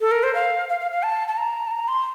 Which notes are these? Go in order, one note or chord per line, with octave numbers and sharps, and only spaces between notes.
A4
A#4
C5
F5
F5
F5
F5
A5
A5
A#5
A5
A#5
C6